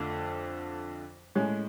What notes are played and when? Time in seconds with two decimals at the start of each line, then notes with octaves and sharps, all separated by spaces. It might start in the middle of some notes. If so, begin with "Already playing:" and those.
Already playing: F2 D3 F3 A3 F4
1.35 A2 G#3 C#4